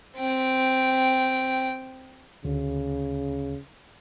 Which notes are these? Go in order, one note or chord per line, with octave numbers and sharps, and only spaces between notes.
C4 G5
D2 C#3